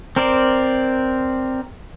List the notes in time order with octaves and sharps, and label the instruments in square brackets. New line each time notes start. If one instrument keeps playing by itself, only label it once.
[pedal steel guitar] C4 A#4 C5 D5